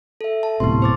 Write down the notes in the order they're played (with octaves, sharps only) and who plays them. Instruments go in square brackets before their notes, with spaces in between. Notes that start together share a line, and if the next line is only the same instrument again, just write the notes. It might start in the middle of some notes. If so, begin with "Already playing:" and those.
[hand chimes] A4 E5
A5
[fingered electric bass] D1 A2 C3 [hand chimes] B3 C6
[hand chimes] C5 D6 A6